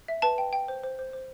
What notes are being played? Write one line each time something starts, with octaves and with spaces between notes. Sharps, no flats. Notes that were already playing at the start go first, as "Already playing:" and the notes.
E5
B4 A5
G5
G5
C5
C5
C5
C5